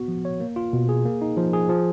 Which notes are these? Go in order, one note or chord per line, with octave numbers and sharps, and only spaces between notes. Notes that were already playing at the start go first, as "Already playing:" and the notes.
Already playing: B3 F#4
F3
C#5
A#3
F4
B2
G#4
A#3
D#4
F3
G#4
F3